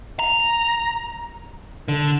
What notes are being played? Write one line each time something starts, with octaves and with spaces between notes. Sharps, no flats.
A#5
D3